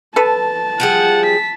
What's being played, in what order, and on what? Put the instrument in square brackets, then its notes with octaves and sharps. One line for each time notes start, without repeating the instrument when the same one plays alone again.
[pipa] A4 B4 [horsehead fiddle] A5
[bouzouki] F3 G3 G#4 [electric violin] F#5
[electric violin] B6